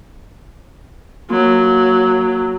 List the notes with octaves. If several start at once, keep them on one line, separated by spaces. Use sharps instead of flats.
F#3 A#3